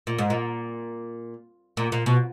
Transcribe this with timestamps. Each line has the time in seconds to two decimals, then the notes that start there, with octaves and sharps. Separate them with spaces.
0.07 A#2
0.18 G#2
0.30 A#2
1.77 A#2
1.92 A#2
2.06 B2